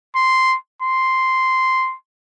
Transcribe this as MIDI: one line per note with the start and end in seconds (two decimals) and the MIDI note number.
0.16 0.57 84
0.82 1.95 84